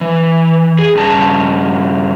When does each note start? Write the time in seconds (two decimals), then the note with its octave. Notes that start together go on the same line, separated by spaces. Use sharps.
0.01 E3
0.79 G#4
0.95 G2 C#3 A5